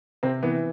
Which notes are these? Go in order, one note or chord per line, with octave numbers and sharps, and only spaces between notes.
C3 C4
E3 B3